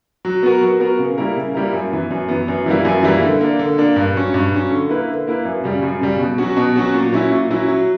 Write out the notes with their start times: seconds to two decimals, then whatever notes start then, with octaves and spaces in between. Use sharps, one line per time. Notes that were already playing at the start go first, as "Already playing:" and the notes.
0.25 F#3
0.43 B3 F#4 A#4
0.61 F#3
0.80 B3 F#4 A#4
0.99 C#3
1.18 G3 A#3 E4 A#4
1.36 C#3
1.54 G3 A#3 E4 A#4
1.73 F#2
1.91 E3 B3
2.11 F#2
2.29 E3 B3
2.48 F#2
2.66 E3 G3 A#3 E4
2.85 F#2
3.03 E3 G3 A#3 E4
3.22 D3
3.41 A#3 D4
3.59 D3
3.78 A#3 D4
3.96 G2
4.15 F#3 C#4
4.34 G2
4.52 F#3 C#4
4.71 D3
4.89 A#3 E4 B4
5.08 D3
5.27 A#3 E4 B4
5.45 F#2
5.64 C#3 G3
5.83 F#2
6.01 C#3 G3
6.19 B2
6.38 F#3 C#4 F#4
6.57 B2
6.76 F#3 C#4 F#4
6.94 A#2
7.12 F#3 C#4 E4
7.31 A#2
7.50 F#3 C#4 E4
7.68 F#3